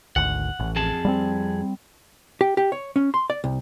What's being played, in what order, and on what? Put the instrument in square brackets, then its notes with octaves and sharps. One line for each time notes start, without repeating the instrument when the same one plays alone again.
[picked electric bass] G#1 D2 [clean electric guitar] F#5
[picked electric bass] A1
[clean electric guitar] F2 G#4 A5
[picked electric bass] G3 A#3 C4
[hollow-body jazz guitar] G4
G4
C#5
C#4
C6
D5
C2